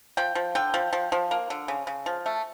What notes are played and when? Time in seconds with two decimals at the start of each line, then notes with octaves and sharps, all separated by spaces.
0.17 F3 G5
0.35 F3
0.55 D3 G5
0.74 F3
0.93 F3
1.12 F3
1.31 A#3
1.50 D3
1.68 C#3
1.87 C#3
2.06 F3
2.26 A3